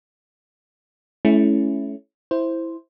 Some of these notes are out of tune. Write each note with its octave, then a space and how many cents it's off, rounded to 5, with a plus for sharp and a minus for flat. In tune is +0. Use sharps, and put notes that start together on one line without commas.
A3 -40 C#4 +0 E4 +0
E4 +0 C5 +0